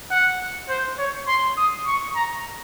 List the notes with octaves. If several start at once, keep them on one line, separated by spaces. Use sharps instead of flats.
F#5
C5
C#5
C6
D#6
C#6
A#5